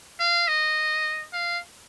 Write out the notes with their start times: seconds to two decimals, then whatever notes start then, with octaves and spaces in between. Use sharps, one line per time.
0.20 F5
0.48 D#5
1.33 F5